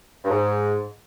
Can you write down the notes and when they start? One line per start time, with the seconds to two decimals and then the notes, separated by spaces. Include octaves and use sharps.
0.24 G2
0.30 G#2